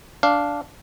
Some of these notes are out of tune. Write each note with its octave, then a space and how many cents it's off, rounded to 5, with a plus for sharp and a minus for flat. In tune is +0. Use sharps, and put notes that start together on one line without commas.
D4 -10 F5 +0